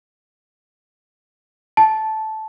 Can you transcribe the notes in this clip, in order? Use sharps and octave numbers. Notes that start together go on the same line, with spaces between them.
A5